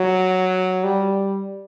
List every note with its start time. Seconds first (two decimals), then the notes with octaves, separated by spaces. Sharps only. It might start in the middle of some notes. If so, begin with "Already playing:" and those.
Already playing: F#3
0.84 G3